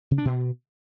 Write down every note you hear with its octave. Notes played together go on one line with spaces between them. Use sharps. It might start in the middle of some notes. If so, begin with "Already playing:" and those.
C#3
D4
B2